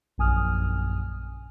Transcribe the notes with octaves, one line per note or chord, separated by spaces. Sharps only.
A#1 F#2 G#5 D#6 F6